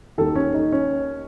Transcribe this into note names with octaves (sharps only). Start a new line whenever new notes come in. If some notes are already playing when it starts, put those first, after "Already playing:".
D#2 D#3 A4
C#4
D#4
C#4